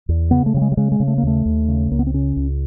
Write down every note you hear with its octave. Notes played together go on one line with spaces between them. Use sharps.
E2
C#3 B3
A3
C#3 G3
G#3
G3
C#3 G#3
G#3
C#3
A3
A#3
D#2 A3
D#2
C#3
C#2 A#3
B3
C4
C#3 C#4
C#2